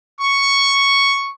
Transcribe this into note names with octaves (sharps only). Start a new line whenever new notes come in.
C#6